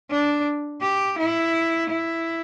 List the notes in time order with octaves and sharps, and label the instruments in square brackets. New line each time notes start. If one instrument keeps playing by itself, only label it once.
[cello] D4
G4
E4
E4